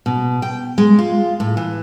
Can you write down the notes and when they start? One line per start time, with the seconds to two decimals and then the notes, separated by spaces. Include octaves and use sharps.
0.06 B2
0.42 G5
0.78 G#3
0.99 F4
1.40 A2
1.57 E3